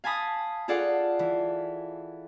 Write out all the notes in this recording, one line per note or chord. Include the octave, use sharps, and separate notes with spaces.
F5 G#5 A5 B5 D#6
F4 G#4 A4 D5 F5 F#5
E3